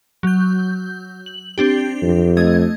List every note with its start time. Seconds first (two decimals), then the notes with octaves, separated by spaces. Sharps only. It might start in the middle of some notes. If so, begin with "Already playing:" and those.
0.23 F#3 G6
1.26 F#7
1.58 C4 D4 G4
2.03 F2
2.37 A3 D#5 G#6